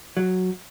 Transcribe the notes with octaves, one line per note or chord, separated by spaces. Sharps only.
F#3